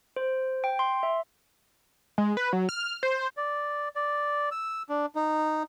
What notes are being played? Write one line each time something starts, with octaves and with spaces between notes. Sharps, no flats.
C5
G5
C6
E5
G#3
B4
F#3
F6
C5
D5
D5
E6
D4
D#4